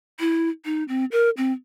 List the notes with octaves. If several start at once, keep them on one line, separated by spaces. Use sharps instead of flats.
E4
D#4
C4
A#4
C4